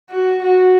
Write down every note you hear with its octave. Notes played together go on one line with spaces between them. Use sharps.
F#4
F#4